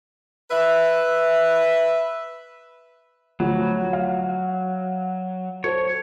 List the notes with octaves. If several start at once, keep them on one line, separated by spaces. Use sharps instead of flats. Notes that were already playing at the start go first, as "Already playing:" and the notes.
B4 E5
D2 F3 F#3
F5
A4 C5 C#5